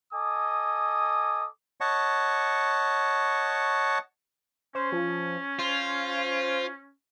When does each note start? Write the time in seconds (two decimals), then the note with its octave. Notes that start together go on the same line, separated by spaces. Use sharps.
0.13 A4 D#5 G#5 D6 D#6
1.81 C#5 D#5 F#5 A5 C#6
4.75 C#4 C5
4.92 F3
5.59 F4 C5